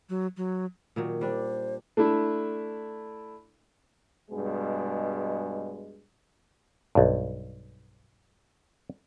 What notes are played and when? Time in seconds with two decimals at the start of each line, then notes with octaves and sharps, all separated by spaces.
0.09 F#3
0.37 F#3
0.96 A#2 D#3 F#3
1.21 G3 D4 C5
1.97 A3 D4 E4
4.31 G2 B2 G#3
6.95 B1 G2